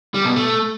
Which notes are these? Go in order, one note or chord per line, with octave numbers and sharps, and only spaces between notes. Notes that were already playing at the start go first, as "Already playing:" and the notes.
G3
B2
A3